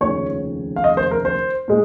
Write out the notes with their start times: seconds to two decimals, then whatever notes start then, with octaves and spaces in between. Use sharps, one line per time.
0.01 F1 D#2 C#3 F3 C#5
0.76 F5
0.84 D#5
0.97 C5
1.11 A#4
1.25 C5
1.68 A#2 G#3